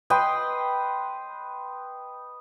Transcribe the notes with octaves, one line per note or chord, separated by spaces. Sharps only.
B4 D#5 G5 C6